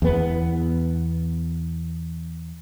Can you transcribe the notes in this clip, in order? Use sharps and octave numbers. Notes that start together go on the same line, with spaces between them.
E2 B3